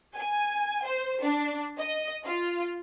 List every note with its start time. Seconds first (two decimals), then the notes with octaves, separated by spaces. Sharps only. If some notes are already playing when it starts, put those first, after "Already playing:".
0.17 G#5
0.85 C5
1.22 D4
1.79 D#5
2.26 F4